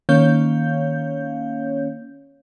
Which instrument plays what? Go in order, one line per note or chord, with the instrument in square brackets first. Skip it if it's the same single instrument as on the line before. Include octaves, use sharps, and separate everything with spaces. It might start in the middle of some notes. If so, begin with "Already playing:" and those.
[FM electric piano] D#3 A#3 C#4 C#5 F5 G6